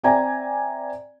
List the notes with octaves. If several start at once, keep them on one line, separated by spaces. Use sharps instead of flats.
C4 D5 E5 G#5 A#5